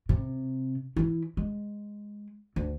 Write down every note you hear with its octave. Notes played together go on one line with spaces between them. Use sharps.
C3
E3 E4
G#3
D2